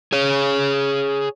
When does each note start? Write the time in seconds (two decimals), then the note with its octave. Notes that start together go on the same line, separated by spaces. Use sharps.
0.12 G#4 C#5